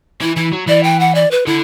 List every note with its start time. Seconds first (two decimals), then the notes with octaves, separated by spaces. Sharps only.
0.21 E3 E4
0.36 E3 E4
0.53 F#3
0.68 E3 D5
0.83 G5
1.00 F#5
1.15 D5
1.31 B4
1.46 D3 E4